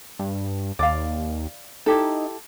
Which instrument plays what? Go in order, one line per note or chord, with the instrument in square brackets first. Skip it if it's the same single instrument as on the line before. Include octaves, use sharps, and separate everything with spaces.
[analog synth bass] G2
[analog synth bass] D#2 [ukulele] D5 F5
[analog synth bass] D#4 [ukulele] E4 G4 A4